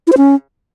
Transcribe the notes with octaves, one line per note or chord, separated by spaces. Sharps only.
E4
C5
C#4